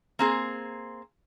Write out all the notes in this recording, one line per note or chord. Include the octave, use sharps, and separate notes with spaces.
A#3 C4 G#4